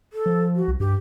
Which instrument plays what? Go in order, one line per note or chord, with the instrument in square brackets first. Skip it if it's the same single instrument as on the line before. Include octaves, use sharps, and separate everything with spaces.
[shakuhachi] A4
[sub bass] F3
[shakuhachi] F#4
[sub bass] C2
[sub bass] G2 [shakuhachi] G4